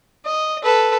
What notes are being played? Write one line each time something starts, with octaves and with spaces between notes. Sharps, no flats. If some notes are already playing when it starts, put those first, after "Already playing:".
D#5
A4 B4